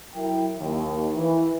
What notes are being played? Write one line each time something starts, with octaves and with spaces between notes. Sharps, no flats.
F#3 E4 A#4 G5
D#2
E3